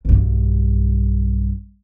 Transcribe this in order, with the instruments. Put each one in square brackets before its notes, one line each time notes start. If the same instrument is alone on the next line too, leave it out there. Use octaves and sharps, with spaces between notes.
[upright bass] B1 G2